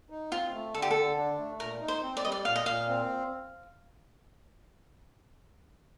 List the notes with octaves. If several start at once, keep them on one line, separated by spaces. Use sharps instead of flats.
D#4
C4 F4
A3
D3 A4
G4
A4
D3
D4
A3
A#2 A#4
D#4
C5
C4
D5
G3 D#5
D5
A#2 F5
D#5
A#2 F5
C4